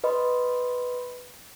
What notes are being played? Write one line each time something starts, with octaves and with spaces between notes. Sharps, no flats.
B4 D#5 B5 C6